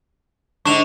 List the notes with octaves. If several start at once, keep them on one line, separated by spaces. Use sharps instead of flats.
G#2 D3 D4 C#6 E7 F7